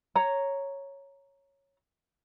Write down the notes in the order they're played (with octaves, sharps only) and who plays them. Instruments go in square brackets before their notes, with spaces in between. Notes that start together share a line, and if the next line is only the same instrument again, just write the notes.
[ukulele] C#5 A#5